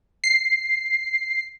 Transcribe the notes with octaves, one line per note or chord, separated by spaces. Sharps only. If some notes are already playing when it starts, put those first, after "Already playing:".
C7